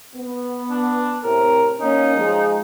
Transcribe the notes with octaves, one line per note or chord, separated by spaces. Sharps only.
B3
D4
A2 C3 C4 A#4
A#3 C#4 D#4
F3 G#3